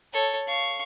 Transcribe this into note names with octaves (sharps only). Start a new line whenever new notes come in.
A4 C#5
F5 C#6